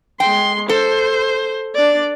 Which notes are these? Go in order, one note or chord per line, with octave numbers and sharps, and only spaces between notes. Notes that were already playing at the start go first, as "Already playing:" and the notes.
G#3 G5 C6
A4 C5
D4 D5